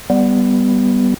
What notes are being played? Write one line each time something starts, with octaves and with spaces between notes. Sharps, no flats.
G3 B3